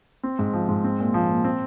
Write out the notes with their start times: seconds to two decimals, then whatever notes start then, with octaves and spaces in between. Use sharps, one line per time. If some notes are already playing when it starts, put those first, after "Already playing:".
0.23 C4
0.39 G#2
0.53 F3
0.69 G#2
0.84 C4
1.00 A#2
1.14 F3
1.30 A#2
1.44 C4